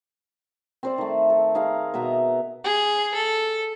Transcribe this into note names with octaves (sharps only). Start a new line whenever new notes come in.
C4 C5 D5
D#3 A3
A4
D#4 G#4 F5
B2 B3 E5 A#5
G#4
A4